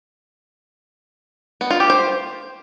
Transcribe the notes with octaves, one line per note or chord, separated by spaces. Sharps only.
B3
F4
G4
C5